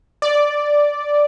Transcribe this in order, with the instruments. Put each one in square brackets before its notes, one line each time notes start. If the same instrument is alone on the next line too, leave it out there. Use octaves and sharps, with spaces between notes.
[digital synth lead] D5